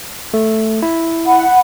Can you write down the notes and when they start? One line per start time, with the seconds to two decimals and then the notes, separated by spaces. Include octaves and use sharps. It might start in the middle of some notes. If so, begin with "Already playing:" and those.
0.34 A3
0.82 E4
1.26 F#5 B5